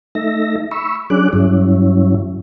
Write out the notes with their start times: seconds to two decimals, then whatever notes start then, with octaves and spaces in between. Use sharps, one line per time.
0.15 A3 D#4 E5 A#6
0.71 B5 C#6 E6
1.10 F#3 C#4 D4 G#4 D6 F#6
1.33 G2 F#3 C#4 E4